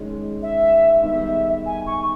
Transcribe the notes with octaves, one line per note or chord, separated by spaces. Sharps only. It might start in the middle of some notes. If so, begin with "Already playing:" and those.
Already playing: D#3 G#3 C#4 G#4
E5
D#3 G3 B3 D#4 G#4 E5
G#5
C#6